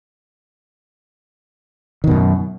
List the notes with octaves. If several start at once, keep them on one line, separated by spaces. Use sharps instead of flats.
F#2 B2 D#3